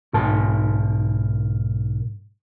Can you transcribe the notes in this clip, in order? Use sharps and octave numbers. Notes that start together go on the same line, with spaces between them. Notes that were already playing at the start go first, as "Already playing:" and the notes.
B1 G#2 A#4 A5